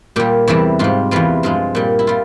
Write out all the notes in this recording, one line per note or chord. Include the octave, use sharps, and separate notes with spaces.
A#2 G3 G4
E2 C3 E3 G3
G#2 G3 F4
E2 E3 G3 F4
G2 F3 G#3 F4
A#2 G3
E4
G3 F4